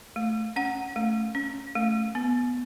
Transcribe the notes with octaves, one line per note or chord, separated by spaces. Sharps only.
A3
C#4 F#5
A3
C#4
A3
B3